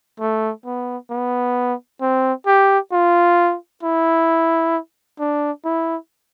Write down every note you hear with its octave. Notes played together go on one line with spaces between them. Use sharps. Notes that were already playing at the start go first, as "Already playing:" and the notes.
A3
B3
B3
C4
G4
F4
E4
D4
E4